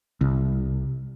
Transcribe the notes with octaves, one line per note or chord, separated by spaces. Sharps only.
C2